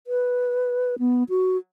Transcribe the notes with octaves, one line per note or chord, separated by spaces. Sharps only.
B4
B3
F#4